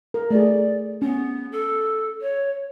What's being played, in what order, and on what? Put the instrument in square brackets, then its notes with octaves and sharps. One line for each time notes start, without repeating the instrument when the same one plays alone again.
[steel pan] A#4
[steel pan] A3 G#4 [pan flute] D5
[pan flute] B3 [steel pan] C#4
[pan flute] A4
C#5